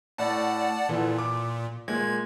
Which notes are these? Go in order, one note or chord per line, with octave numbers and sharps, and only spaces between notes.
A2 D5 F#5 A5
A#2 E3 A4
D6
A#2 G#3 G#6